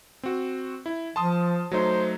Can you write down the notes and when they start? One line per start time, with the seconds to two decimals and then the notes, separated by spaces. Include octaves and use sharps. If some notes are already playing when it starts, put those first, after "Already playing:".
0.23 C4 F#4
0.86 E4
1.16 F3 A5 C6 D#6
1.71 F#3 A3 D#4 C5